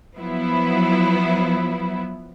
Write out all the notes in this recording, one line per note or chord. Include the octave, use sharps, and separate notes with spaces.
F3 F#3 B3 E4